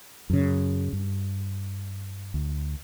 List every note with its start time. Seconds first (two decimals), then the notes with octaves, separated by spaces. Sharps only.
0.30 F#2 C#3
0.93 G2
2.34 D2